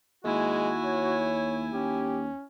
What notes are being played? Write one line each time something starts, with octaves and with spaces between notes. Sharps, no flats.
D#2 G#3 E4 F#4 G#5
C#5
D#2 C#4 G4